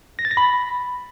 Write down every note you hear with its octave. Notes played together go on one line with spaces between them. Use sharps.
A#6
A6
A#6
B5